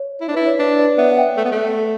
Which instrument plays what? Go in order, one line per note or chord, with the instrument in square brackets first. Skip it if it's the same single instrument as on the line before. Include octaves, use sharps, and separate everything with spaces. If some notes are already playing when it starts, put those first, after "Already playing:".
Already playing: [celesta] C#5
[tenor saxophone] E4
D4
[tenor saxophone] E4 [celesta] B4
[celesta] C#5
[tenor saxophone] D4 [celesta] B4 D5
[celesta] B4 D5
[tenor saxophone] B3 [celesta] C#5 E5
[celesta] F#5
E5 G5
[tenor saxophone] A3
B3
A3